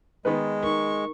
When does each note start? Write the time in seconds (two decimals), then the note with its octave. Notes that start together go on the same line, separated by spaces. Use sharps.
0.25 D#3 G#3 B3 B4
0.63 D#4 A#4 C#6